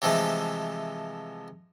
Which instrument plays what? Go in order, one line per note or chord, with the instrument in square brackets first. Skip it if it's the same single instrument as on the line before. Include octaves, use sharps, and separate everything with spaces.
[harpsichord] C3 E3 F3 G#3 A3